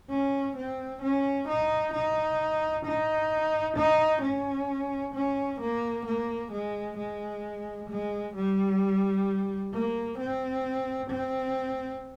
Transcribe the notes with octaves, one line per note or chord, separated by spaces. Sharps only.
C#4
C4
C#4
D#4
D#4
D#4
D#4
C#4
C#4
A#3
A#3
G#3
G#3
G#3
G3
A#3
C4
C4